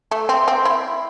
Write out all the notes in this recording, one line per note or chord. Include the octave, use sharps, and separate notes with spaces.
A3
C4
C4
E4